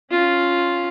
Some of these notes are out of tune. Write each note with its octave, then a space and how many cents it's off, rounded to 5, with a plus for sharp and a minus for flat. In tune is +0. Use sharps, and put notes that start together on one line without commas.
C#4 +0 F4 +0